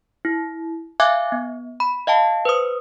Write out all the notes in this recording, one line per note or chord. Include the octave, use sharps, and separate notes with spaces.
E4
E5 F5 G#5 D6 F#6 G#6
B3
B5
D#5 F5 G5 A5
B4 C5 D#6